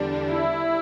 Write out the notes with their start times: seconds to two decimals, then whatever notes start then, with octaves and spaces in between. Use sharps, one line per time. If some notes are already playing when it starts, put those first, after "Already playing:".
Already playing: E2 D3 G3 D4
0.29 E4